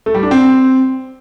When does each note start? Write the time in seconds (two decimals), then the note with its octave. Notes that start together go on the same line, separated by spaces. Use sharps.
0.06 A3
0.15 G3
0.23 D4
0.31 C4